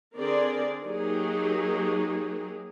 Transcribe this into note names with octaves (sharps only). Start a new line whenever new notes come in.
D3 C4 G#4 A#4 D5
F#3 A#3 D#4 G4 G#4